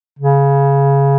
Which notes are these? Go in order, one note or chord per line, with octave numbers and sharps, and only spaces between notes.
C#3